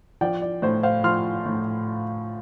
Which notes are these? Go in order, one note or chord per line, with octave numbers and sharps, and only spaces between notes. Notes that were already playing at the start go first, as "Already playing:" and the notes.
F3 D5 G5
D5
A2 C5
C5 F5
F3 C6 F6
A2